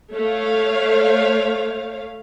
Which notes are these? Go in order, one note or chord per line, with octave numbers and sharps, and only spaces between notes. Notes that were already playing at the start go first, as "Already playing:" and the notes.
A3 C#5 F5